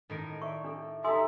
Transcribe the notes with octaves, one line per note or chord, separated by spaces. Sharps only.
A2 D#3 A#4
D5 E5 C#6
D4 A4
D#4 G4 A4 E5 G#5 C6 D#6